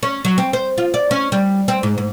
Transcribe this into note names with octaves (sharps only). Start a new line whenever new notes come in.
C#4
F#3
C4
C5
F4
D5
C#4
G3
C4
G#2
G#2